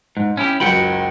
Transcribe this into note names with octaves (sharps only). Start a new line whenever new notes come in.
G#2
C#4 E4 G4
F#1 C#2 F#3 F#5 G5 B5